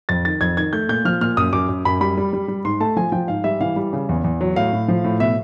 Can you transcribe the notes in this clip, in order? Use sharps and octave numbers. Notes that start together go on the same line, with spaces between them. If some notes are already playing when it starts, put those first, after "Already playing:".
F2 A6
D#3 A6
F2 G#6
D#3 G#6
A3 G6
A#2 G6
F3 F6
A#2 F6
F#2 D#6
F#2 D6
F#2
F#2 B5
G3 B5
G3
G3
G3
G#2 C6
A3 A5
F3 G#5
F3 G5
G#2 F5
G3 E5
E3 F5
G3
C#3
E2
E2
F#3
A2 F5
A2
F3
A2
B2 E5